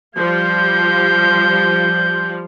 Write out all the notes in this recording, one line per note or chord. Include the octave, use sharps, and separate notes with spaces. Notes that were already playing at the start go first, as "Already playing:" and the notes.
F3 G3 F4 G6